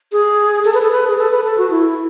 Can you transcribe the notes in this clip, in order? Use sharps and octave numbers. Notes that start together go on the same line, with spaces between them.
G#4
A4
B4
A4
B4
G#4
A4
B4
A4
F#4
E4